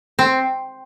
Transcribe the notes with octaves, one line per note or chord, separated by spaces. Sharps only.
C4